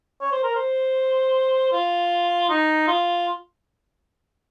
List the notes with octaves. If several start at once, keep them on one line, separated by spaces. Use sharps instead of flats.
C#5
C5
A#4
C5
F4
D#4
F4